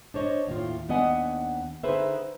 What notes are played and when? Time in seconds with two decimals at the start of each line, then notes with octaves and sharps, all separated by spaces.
0.14 D4 C5 C#5 D#5
0.47 D#2 A2 F4
0.89 D#2 B3 D4 D#5 F#5 G#5
1.83 D3 D#4 G#4 B4 C5 E5